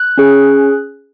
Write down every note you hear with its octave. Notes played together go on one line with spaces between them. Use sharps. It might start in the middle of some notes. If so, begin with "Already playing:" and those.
Already playing: F#6
C#4 G#4